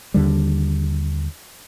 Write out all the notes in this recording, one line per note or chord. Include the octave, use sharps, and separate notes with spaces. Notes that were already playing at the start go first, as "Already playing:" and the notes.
D#2 D3 G3